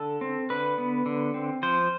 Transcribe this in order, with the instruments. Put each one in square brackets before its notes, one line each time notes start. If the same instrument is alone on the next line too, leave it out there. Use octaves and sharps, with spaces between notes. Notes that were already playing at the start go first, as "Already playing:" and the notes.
Already playing: [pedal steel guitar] D3 A4
C4
D3 B4
B3
D3
C4
F3 C5